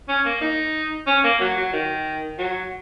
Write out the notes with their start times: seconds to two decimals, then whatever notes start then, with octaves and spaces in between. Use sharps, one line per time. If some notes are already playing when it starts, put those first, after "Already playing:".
0.08 C#4
0.25 A#3
0.41 D#4
1.07 C#4
1.24 A#3
1.40 F#3
1.57 F#3
1.73 D#3
2.38 F#3